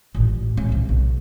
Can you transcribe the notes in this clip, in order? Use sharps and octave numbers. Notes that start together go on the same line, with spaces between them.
A1 A#2
G#3 C#4
C2 C3
B1